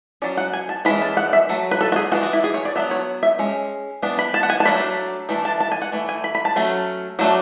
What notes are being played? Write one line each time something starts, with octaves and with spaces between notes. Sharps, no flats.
F#3 C#4 D5
F#5
G#5
A5
E3 G#3 C#4 B5
A5
F#5
E5
F#3 A3
B4
A4
F#4
G#4
E3 G#3 D4 F#4
F#4
E4
G#4
C#5
D5
F#3 B3 D4 E5
C#5
E5
G#3 C#4
E3 B3 D4
B5
A5
F#5
G#5
A5
F#3 A3 D4 B5
E3 A3 D4
A5
A5
G#5
F#5
E3 A3
G#5
B5
B5
A5
F#3 A3 C#4
F#3 A3 D4